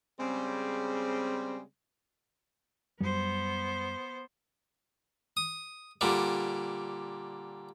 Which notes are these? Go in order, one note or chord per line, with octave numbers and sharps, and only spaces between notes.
C#3 G3 G#3 C4
F#2 F#3 G3 B3 C5
D#6
A#2 D3 G3